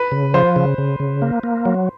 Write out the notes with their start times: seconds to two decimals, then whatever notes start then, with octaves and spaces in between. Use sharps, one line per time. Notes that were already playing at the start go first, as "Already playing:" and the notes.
Already playing: B4
0.12 C#3
0.34 F3 C5
0.56 C#3
0.78 C#3
1.00 C#3
1.22 A#3
1.43 A#3
1.65 F#3